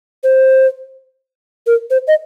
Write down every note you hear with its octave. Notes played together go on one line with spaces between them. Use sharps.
C5
A#4
C5
D#5